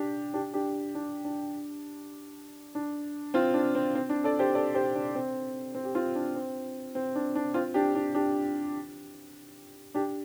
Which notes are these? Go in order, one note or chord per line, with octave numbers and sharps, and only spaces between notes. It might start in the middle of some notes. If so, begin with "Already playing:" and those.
Already playing: D4 G4
D4 G4
D4 G4
D4
D4
D4
C4 F4
D4
C4
C4
D4
A4 D5
G4 C5
A4 D5
G4 C5
D4
C4
C4
G4
C4 F4
D4
C4
C4
D4
D4
C4 F4
D4 G4
D4
D4 G4
D4 G4